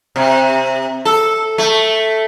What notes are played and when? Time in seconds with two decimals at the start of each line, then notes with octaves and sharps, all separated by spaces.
0.16 C3
1.05 A4
1.58 A3